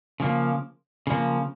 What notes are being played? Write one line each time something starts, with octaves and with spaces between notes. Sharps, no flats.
C#3 F3 A#3
C#3 F3 A#3